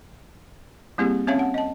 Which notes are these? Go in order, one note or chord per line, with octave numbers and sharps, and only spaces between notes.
G3 A#3 C4 E4 G4 G#4
C4 C#4 C#5 E5 F5 A5
F#5
D#5 A5